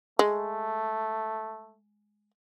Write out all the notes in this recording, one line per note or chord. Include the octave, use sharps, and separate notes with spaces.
G#3 A3